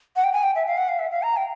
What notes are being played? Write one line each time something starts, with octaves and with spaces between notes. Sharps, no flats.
F#5
G5
G#5
G5
E5
F5
F#5
F5
E5
F5
A#5
G5